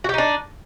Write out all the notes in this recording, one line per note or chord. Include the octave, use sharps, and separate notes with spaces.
D4 D#4 F#4 G4